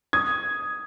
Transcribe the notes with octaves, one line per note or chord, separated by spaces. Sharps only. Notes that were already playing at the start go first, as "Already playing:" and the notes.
D#6 G#6